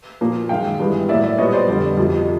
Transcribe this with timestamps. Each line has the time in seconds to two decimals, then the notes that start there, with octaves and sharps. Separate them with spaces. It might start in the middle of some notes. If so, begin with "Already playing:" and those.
0.21 A#2 F3 A#3
0.49 F#2 D#3 G#3 F5 G5
0.79 G2 E3 G#3 B3
1.09 A2 F#3 A#3 D5 E5
1.23 D5 E5
1.38 A#2 G3 B3 C#5 D#5
1.53 C5 D5
1.68 F2 D3 G3 B3
1.97 F2 C3 F3